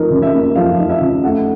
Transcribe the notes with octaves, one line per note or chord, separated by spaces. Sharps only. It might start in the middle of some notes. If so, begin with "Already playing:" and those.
Already playing: F3 D#4 A#4
C#3
E5
A#3
F3 F5
D#4
E5
C#3
A3 F#5